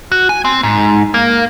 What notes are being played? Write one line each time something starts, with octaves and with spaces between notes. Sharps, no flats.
F#4
G#5
C4
G#2
A#3